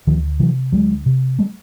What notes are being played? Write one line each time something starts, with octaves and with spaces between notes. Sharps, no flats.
D2 D#3 F3
C3 E3 F#3
D2 F#3 G#3
C3
G3 A3